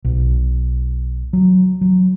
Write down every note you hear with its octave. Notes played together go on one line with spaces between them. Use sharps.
B1
F#3
F#3